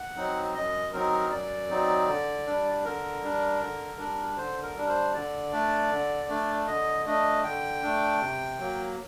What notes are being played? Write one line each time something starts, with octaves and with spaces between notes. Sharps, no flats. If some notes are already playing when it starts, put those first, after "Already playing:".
Already playing: F#5
F#3 C4 D#4
F#2 D#5
F#3 C4 D#4 A#4
F#2 D5
F#3 C4 D#4
D3
G3 D4
D3 A#4
G3 D4
D3
G3 D4
D3 C5
A#4
G3 D4
C5
D3 D5
A3 D4
D3
A3 D4
D3 D#5
A3 D4 D#5
D3 G5
A3 D4
C3
F#3 A#3